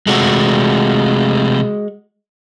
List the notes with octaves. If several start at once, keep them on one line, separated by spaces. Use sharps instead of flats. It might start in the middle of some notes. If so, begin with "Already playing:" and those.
C3 G#3 A3 F#4